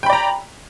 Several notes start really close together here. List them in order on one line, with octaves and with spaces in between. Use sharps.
G5 B5 D5 A#5